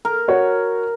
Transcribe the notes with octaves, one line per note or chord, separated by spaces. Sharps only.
A#4
F#4 C#5 F#5